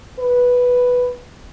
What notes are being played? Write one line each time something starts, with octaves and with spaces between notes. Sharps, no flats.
B4